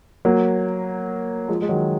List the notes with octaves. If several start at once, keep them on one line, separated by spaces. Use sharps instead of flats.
F#3 A#3
F3 G#3
G#3
D#3 F#3